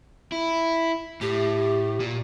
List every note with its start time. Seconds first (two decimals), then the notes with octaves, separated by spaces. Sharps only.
0.32 E4
1.21 A2 G4
2.00 A#2